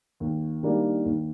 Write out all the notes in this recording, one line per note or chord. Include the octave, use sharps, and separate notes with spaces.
D#2
D#3 G3 A#3 D4
D#2